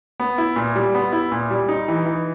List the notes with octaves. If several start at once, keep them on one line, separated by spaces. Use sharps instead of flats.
B3
E4
A#2
G3
B3
E4
A#2
G3
D#4
E3
E3